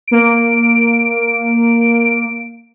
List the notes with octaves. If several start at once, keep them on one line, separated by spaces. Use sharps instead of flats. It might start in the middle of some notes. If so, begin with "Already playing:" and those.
A#3 D7